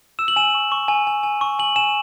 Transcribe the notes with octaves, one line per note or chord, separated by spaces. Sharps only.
E6 E7
F#7
G#5 E7
C#6
C#6
G#5
G#5
G#5
C#6
G#5 F#7
G#5 E7